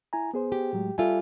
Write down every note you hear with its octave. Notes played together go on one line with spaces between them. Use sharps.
E4 G#5 A#5
B3 G#4 C5
G4
A2 F#3 G#3
G3 F4 A4 E5 G#5